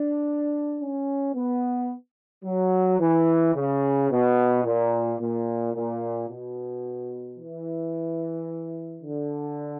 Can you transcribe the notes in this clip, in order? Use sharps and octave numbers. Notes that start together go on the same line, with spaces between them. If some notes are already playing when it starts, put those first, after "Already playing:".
Already playing: D4
C#4
B3
F#3
E3
C#3
B2
A#2
A#2
A#2
B2
E3
D3